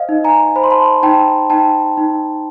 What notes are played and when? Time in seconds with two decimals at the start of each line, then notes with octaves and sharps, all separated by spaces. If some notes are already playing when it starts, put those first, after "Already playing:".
Already playing: C5 D#5 F5
0.09 D#4
0.24 G#5 A#5
0.56 C5 B5
0.64 C6
0.71 A5 B5
1.03 D#4 G5 A5
1.50 D#4 G5 A5
1.97 D#4